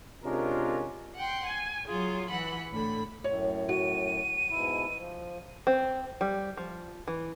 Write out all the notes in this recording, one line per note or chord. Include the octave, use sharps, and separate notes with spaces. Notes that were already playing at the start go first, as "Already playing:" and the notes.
C3 G#3 C#4 D4 F4 A#4
F#5 G5 C6
G#5
F#3 F4 G#4
E3 F#5 B5
A2 D3 B5
F#2 A2 C#5
F#4 D#7
G#2 B2 E4
F3
C4
G3
F3
E3